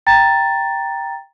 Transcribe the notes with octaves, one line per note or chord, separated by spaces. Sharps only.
G5 A#5 A6